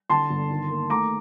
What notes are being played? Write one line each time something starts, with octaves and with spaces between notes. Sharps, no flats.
D3 A5 C6
G1
D#3
A#3
A3 A#5 D6